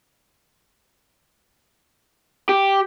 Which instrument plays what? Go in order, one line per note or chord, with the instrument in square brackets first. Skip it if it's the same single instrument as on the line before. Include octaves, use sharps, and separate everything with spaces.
[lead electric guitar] G4